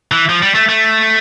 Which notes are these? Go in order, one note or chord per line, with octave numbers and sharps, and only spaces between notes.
E3
F3
G3
A3
A3